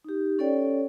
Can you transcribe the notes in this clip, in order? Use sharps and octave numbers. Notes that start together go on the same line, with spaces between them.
D#4 G4
C#4 A4 C#5 D5 G5